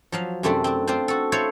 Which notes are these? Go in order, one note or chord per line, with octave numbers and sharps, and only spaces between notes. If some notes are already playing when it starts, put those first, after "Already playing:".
F3 F#3 F5
F#2 C3 A3 C4 D4 E4
C4 D4
C4 D4 F4 C5
F#4 A4
E4 A4 C5 C#5 F5